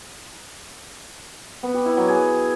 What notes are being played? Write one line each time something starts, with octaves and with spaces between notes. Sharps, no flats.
B3
G4
E4
F#3
G#4